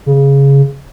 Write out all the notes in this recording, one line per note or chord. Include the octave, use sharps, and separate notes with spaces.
C#3